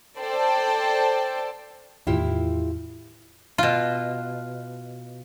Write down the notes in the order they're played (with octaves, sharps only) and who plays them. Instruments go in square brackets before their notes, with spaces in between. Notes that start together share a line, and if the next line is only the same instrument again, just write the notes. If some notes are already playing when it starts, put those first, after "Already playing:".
[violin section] A4 C5 D5 G5 A5
[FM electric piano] E2 A2 D#3 [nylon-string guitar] E4 F4 G4
[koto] B2 F4